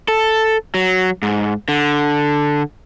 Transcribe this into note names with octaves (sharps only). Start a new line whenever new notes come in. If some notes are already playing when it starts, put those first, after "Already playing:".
A4
F#3
G#2
D3